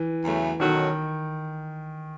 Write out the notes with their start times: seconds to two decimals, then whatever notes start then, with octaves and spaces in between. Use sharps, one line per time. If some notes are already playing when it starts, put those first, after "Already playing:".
Already playing: E3
0.23 E2 C#3 F#3 A3
0.60 B2 D#3 F#3 C#4 F#4 A4